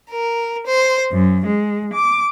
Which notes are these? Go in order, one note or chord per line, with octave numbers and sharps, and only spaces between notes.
A#4
C5
F#2
G#3
D6